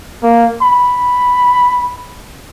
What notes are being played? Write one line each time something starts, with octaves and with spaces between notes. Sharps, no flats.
A#3
B5